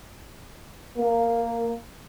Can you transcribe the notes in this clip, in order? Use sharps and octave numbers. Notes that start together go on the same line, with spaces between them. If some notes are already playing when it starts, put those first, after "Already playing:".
A#3